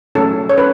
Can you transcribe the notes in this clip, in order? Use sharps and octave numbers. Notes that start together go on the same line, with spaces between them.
F#3 A3 C#4 A4
C#5
C#4 B4